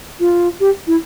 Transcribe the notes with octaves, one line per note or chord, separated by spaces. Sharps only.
F4
G4
E4